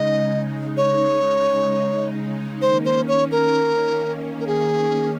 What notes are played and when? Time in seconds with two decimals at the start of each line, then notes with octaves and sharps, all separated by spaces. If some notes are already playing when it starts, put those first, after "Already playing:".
Already playing: C#3 G#3 D#4 D#5
0.77 C#5
2.61 D#3 A#3 C#4 C5
2.85 C5
3.08 C#5
3.31 A#4
4.40 A#4
4.47 G#4